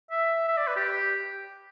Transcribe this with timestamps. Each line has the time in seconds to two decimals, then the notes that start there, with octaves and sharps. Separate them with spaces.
0.11 E5
0.48 E5
0.57 D5
0.67 B4
0.76 G4